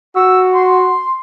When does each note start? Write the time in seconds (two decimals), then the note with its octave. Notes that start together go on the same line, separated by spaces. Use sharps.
0.16 F#4 E6
0.54 C6